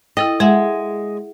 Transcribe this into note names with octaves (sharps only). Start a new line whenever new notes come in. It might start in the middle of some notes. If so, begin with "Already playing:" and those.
E4 A4 D#5 G5
G#3 G#4 E5 F#5